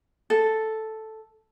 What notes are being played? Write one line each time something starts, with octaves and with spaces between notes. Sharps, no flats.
A4